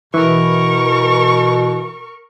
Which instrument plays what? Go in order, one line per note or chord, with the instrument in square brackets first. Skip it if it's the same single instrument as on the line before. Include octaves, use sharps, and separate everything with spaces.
[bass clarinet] B2 [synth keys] E3 [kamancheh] A#4 C#6